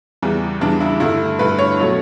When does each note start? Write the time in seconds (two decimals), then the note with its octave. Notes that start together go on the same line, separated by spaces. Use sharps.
0.22 E2 C#3 E3 G3
0.61 E2 C#3 E3 G3 D4
0.80 E4
1.00 G2 D3 A3 E4
1.39 G2 D3 A3 B4
1.59 C#5
1.79 B2 F#3 A3